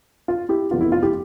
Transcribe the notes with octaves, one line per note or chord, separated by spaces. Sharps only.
F4
E4 G4
F1 F2 E3 B3 F4
E4
F4
E4 G4